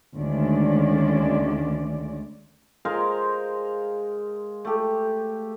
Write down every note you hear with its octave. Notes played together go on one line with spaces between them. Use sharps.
D2 D#3 G#3 C#4 D5
G#3 A#4 C5 F5
A3 G4